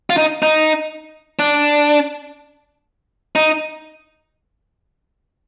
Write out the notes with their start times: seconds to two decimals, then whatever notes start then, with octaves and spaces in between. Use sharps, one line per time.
0.10 F4
0.17 D#4
0.42 D#4
1.39 D4
3.35 D#4